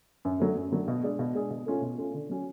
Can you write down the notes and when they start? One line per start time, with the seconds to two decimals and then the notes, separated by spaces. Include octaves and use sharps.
0.25 F#2
0.40 D3 F#3 A3
0.56 F#2
0.72 D3 F#3 A3
0.88 B2
1.03 G#3 D4 G#4
1.19 B2
1.35 G#3 D4 G#4
1.50 B2
1.66 A3 C#4 F4
1.82 B2
1.98 A3 C#4 F4
2.13 D3
2.30 F#3 C#4 F#4